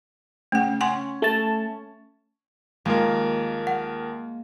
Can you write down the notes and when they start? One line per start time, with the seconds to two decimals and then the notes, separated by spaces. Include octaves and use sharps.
0.52 C#3 A3 F#5
0.81 C#4 F#5 G#5 C6
1.22 A3 A5
2.85 D#2 G#3 A#3 F4 A#4
3.67 F#5